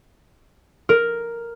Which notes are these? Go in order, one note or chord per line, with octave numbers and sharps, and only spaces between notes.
A#4